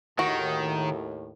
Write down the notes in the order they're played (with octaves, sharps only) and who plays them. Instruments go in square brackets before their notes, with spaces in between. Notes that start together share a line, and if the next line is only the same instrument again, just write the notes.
[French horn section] D#2 A2 [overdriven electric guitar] D#3 [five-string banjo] F#4